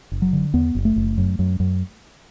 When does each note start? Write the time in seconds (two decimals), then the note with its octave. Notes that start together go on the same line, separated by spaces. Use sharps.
0.12 F#1
0.22 F#3
0.33 D3
0.54 E2 B3
0.75 F#1
0.85 A3
0.96 F#1
1.18 F#2
1.39 F#2
1.60 F#2